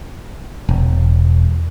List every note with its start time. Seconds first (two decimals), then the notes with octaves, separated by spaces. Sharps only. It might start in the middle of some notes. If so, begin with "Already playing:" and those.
0.69 E1